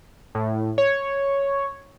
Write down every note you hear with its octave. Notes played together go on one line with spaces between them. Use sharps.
A2
C#5